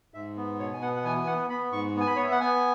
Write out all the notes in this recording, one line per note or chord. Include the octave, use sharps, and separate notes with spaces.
G#2 E5
B3
B2 C#5
G#5
B3 F#5
F#5
E3 G#5
G#5
B3 F#5
B3 B5
G#2 C#6
B3
G#5
B5
B3 C#5
E5
F#5
B3 G#5